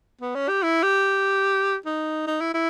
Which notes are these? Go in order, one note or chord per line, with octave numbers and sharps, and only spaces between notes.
B3
C#4
G4
E4
G4
D#4
D#4
E4
E4